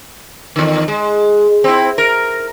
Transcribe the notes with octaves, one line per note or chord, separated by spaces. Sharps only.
E2 D#3
G#3
C4 E4
A#4